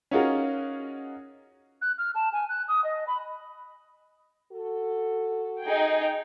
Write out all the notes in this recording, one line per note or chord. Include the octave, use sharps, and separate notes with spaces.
C#4 D#4 F4 F#4 G#4 A#4
F#6
F6
A5
G#5
F#6
D#6
D#5
B5
F#4 A4
D#4 G#4 G5